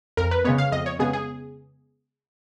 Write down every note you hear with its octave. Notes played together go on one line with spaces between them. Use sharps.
F2 A#4
B4
C#3 G#3 B3 C#5
F5
F2 D#5
C#5
C#3 G#3 B3 G#4
G#4